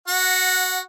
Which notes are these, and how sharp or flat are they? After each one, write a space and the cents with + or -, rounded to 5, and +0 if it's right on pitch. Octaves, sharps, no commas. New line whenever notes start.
F#4 +0 F#5 -15